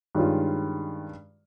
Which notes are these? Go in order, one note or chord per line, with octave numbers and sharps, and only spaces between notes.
G2 D#3 G#3 C#4 F4